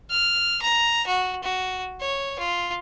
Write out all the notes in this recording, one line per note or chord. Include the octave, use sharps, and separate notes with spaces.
F6
A#5
F#4
F#4
C#5
F4